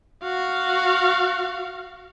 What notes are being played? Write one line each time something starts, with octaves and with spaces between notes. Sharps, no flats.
F#4 F5